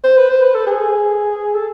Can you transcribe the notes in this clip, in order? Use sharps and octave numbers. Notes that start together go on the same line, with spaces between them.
C5
B4
C5
B4
A4
G#4
A4